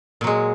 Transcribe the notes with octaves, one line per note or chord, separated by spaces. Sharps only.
A#2 F#3 G#3